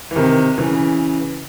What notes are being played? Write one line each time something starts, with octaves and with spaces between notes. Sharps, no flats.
E3
C3 D#3
C#3 E3